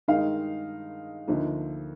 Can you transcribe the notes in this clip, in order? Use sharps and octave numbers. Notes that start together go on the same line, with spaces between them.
G2 D#3 G#3 D#4 F5
D2 D3 F3 A#3 D#4